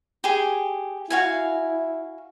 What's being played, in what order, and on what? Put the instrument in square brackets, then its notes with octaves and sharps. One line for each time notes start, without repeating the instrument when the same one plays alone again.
[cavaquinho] G4 G#4
[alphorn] E4 [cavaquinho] F#4 F5 G#5